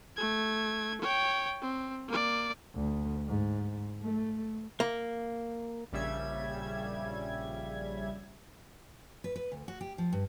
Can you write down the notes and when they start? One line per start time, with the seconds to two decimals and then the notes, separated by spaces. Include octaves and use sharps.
0.16 A3 G#6
1.01 C#5 G5
1.62 C4
2.08 A#3 D5
2.75 D2
3.28 G#2
4.03 A3
4.80 A#3
5.92 A#1 C#3 G3 E5 G#6
9.24 B4
9.36 B4
9.52 D2
9.68 F#4
9.81 G4
9.98 F3
10.13 G2